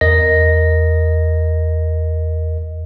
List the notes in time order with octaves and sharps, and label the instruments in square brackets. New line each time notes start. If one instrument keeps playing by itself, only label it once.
[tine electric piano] E2 A#4 D#5 A#6